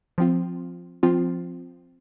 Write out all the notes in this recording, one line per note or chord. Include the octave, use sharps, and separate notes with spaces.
F3 C4 F4
F3 C4 F4